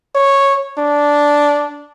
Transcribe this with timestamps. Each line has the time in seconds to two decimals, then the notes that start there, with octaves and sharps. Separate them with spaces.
0.15 C#5
0.78 D4